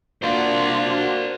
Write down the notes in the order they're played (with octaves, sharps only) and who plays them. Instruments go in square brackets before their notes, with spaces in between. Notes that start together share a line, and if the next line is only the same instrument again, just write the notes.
[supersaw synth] A#3 F#4 [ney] D4 [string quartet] F4 [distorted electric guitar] C5 D5